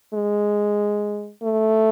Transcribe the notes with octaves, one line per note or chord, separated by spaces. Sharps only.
G#3
A3